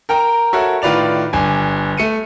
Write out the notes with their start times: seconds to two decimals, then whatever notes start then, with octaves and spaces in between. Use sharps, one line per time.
0.09 A#4 G5 A#5
0.53 F#4 A4 A#4 C#5 E5
0.82 A2 D#3 F4 B4 D5 F7
1.33 G1 D4 G#5
1.97 A3 C#7 D#7